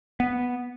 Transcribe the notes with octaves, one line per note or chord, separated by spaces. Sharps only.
B3